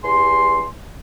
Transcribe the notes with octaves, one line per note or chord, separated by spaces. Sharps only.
E2 G4 G#5 C6